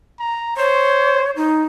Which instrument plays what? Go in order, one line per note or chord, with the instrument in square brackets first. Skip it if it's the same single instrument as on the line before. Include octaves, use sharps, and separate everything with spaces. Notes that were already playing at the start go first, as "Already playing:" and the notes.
[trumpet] A#5
[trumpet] C5 [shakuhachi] C#5
[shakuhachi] D#4